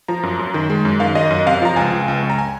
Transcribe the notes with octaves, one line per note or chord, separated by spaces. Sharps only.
F3 A#5
F#2
F#2
D#3
G#3
F#2
D#3 F5
F#2 D#5
F#2
C3 F5
F3 A#5
C#2 G#5
C#2
C#2
C#2
A#5
G#5